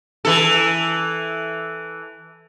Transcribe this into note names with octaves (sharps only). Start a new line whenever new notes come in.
E3 A4